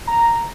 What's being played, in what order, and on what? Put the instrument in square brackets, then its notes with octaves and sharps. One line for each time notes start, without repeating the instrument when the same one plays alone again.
[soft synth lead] A#5